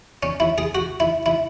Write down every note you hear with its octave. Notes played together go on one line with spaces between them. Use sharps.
C#4
E4
G#4
F#4
E4
E4